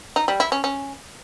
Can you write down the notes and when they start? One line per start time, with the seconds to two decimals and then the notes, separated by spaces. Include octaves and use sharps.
0.16 D#4
0.28 G3
0.40 E4
0.52 C#4
0.64 C#4